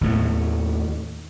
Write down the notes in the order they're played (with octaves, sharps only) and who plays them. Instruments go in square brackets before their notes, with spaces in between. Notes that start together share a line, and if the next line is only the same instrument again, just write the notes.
[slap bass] D#2 A2 A3